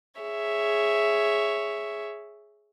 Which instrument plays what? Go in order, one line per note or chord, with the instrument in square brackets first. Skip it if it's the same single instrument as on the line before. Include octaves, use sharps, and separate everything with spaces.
[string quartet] G#4 C#5 E5